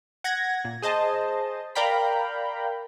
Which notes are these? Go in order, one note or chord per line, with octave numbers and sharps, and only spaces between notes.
F#5 G#6 A#6
A#2
G#4 C5 D#5 A5
A#4 D5 F5 G5 A#5 B5